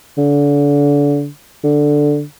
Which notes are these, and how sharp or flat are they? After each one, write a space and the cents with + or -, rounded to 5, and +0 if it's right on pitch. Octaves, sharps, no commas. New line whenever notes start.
D3 -30
D3 +0